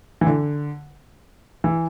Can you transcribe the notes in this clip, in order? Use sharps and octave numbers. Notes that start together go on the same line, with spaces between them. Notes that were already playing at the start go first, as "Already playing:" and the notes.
E3
D3
E3